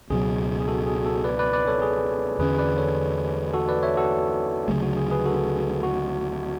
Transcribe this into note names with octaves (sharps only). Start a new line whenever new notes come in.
C#2 B2 F#3 G#4
G#4
F#4 A4
G#4
F#4 A4
B4 D5
B4 D5
B4 D5
A4 C#5
G#4
E2 D3 A3 C#4 G#4 B4
B4 D5
A4 C#5
F#4 A4
B4 D5
C#5 E5
F#4 A4
D2 C#3 F#3 A3 G#4
F#4
G#4
G#4 B4
F#4 A4
F#4